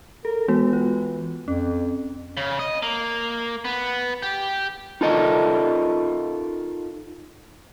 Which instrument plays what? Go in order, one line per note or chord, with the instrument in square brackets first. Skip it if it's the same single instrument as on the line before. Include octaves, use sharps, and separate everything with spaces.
[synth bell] A4 [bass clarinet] A#4
[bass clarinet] E3 [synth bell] G#3 B3 F#4
[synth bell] F4
[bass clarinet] F2 [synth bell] C#4
[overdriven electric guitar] C#3
D#5
A#3
B3
G4
[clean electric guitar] D#4 F4 A4 A#4 D#5